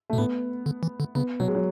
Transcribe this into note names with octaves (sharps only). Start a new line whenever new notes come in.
A3
B2
A2 B3
D3
E3
D3
C#3 B3
B2 F#3
G#3
F#3